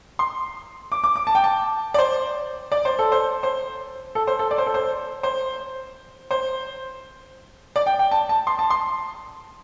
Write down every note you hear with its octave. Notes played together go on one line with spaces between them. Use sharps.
C6
D6
D6
D6
A5
G5
A5
D5
C5
D5
C5
A4
C5
C5
A4
C5
A4
D5
C5
A4
C5
C5
C5
D5
G5
G5
A5
A5
C6
A5
C6